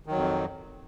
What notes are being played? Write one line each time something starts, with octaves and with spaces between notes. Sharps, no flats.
F2 D#3 F#3